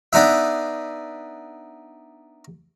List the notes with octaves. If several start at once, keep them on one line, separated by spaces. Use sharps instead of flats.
B3 D4 D#4 E5